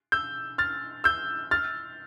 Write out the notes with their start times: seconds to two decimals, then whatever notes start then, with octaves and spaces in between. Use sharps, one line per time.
0.12 E6 G6
0.58 F6 A6
1.04 E6 G6
1.51 F6 A6